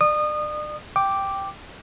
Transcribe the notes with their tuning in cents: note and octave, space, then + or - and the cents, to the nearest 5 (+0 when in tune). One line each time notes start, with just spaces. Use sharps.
D5 +35 D#6 -25
G5 +0 D6 +0